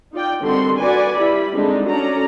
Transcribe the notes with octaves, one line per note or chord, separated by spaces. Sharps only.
D#4 F4 D5 G5
D3 D#3 G3 C4 F#4 C6
F#4 B4 D5 G#5
G3 E4 B5
D3 G#3 C4 D4 D#4
F#3 C#4 D4 A4 D5 A#5